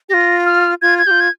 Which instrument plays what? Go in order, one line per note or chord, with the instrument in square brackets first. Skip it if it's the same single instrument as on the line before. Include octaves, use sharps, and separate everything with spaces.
[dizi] F4 G4 [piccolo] A#6
[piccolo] F6
[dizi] F4 [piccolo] G#6
[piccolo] G#6
[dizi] F4 G4 [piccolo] G6
[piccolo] G#6